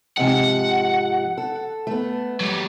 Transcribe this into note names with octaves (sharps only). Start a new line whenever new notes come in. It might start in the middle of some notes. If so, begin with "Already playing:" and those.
G#2 C3 F3 F#5
A4
A3 B3
F#3 G4